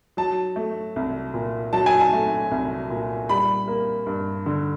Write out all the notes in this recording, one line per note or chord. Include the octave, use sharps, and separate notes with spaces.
F#3 A5
A3
C2
A#2
F#3 A5
G#5
A5
A3
C2
A#2
G3 B5
A#3
G2
D3